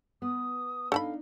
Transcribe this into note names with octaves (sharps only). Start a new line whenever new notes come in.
B3 D#6
D4 D#4 A4 F5 A5 B5